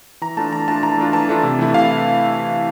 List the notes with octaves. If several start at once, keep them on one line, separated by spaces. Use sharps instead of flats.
E3 A#5
A3 D4 F4 A5
E3 A#5
A3 D4 F4 A5
E3 A#5
A3 D4 F4
E3 A5
A3 D4 F4
C3
E3 A3 E4
C3 F5